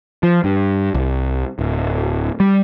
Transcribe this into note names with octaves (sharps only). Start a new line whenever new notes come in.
F3
G2
C2
D1
G3